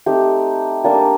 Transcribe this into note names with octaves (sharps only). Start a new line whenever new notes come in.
A3 C4 D#4 G4
G3 A#3 D4